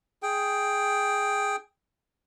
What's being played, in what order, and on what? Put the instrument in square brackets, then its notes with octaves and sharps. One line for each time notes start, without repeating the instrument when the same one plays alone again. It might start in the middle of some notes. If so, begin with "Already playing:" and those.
[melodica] G#4 G5